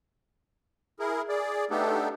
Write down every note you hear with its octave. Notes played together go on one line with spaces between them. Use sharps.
E4 G#4 A#4
G#4 D5
A3 B3 D4 D#4 G4 A4